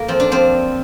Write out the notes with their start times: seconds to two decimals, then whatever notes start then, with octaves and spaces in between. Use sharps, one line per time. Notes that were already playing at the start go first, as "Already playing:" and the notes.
Already playing: A#3
0.08 F3 C4
0.20 D4
0.32 F3 C4